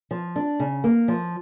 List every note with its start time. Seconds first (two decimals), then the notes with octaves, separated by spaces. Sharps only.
0.11 F3
0.36 D4
0.60 C#3
0.84 A#3
1.08 F3